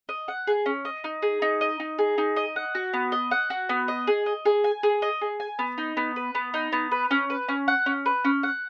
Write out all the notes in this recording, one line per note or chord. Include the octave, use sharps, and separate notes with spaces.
D#5
F#5
G#4
C#4
D#5
D#4
G#4
D#4
D#5
D#4
G#4
D#4
D#5
F#5
F#4
B3
D#5
F#5
F#4
B3
D#5
G#4
D#5
G#4
G#5
G#4
D#5
G#4
G#5
B3
D#4
B3
B4
B3
D#4
B3
B4
C#4
B4
C#4
F#5
C#4
B4
C#4
F#5